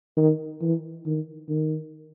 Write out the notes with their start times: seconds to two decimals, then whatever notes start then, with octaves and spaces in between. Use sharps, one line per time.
0.17 D#3
0.62 E3
1.06 D#3
1.49 D#3